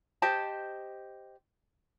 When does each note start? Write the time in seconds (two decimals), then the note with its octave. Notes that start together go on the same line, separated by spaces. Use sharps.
0.22 G4 C5 D#5 A5